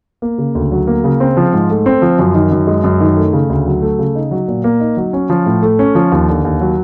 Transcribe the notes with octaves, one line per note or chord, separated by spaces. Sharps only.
A#3
C#3
D2
F#3
A#3
C#3
C4
F3
G#2
A3
C4
F3
F#2
D#3
F#2
G#3
F#2
D#3
A3
C#3
D2
F#3
A3
C#3
D#4
F#3
A#2
A#3
D#4
F#3
C#4
F3
A2
A3
C#4
F3
D#2
D3
D#2
F#3